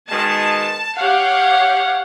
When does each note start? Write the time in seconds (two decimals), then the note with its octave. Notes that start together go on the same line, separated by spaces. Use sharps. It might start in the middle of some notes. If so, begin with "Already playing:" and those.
0.10 B2 D#3 G#3 A5
0.97 G4 C#5 F5 F#5